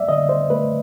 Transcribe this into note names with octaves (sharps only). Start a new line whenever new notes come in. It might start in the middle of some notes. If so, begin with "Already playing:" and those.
Already playing: F#3 D5 E5
D3 D#5
C5
A3 B4